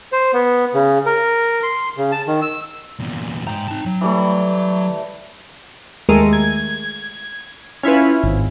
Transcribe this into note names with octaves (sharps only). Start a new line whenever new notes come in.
C5
B3
C#3
A#4
C6
C#3
A5
D#3
E6
E2 A#2
G#2 G5 A#5
D#4 A5
F#3
E3 G3 A3
D#2 G#3 A3 A#4 D#7
G#6
C#4 E4 F4 B4
G#1